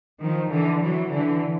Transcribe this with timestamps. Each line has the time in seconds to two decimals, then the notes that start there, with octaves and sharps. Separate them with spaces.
0.21 D#3 F3
0.51 D3 E3
0.81 E3 F#3
1.12 D3 E3